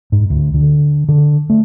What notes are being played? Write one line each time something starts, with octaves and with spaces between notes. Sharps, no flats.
G#2
D2
D3
D3
A3